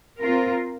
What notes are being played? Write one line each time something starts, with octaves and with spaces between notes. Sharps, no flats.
C4 F4 A#4